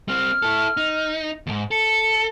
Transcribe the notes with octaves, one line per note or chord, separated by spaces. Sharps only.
G3 C4 F6
E4 A4
D#4
D#2 G#2
A4 C#7